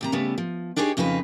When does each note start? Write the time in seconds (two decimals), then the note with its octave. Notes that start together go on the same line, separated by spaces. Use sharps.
0.01 D#2 C3 A#5
0.12 C#3 G3 A3 B3
0.38 F3
0.76 D4 D#4 G4 G#4 B4 C#5
0.97 F2 C#3 F3 D#4 B4